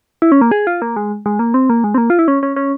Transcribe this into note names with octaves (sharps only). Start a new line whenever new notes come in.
E4
C#4
A#3
G#4
F4
A#3
G#3
G#3
A#3
C4
A#3
G#3
C4
A#3
F4
E4
C#4
C#4
C#4